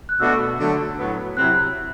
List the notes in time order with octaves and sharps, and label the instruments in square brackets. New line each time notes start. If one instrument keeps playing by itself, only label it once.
[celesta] F#6
[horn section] B2 A3 D4 F#4 [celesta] E6
[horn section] D3 F#3 A3
A2 F#3 B3
[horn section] C3 F#3 C4 E4 [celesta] F#6